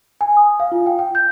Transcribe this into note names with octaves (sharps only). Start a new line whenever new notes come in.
G#5
D#6
F5
F4
G5
G5
G6